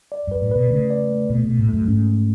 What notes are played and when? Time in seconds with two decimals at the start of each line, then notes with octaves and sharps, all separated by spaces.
0.12 D5
0.27 F#2 B4
0.41 A2
0.51 B2 B4
0.70 C#3 A3
0.90 D5
1.10 A3
1.30 B2 A3
1.44 B2 A3
1.59 A2
1.68 F#2 A3
1.88 G#2 C#4
2.07 A3